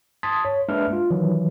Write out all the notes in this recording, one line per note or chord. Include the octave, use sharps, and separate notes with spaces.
A5 C6 D#6 G#6 A6 B6
C#5
G#3 A#3 D4 B4 E5 F6
F4
D#3 E3 F#3